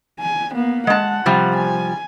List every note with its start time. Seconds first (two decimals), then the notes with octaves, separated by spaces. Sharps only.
0.20 G#5
0.52 A#3 B3
0.87 G#3 F#5 A5
1.26 C3 F3 G3
1.57 G#5